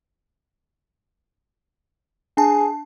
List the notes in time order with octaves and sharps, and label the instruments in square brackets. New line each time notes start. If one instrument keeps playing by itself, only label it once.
[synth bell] D4 A5 [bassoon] G#4